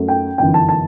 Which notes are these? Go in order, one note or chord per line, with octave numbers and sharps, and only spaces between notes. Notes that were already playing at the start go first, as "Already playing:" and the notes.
Already playing: F#2 F#3 A3
G5
G1 F#2 E3 G5
A5
A5